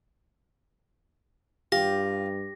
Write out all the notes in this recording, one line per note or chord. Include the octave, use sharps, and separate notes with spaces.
G2 F4 G4 A#6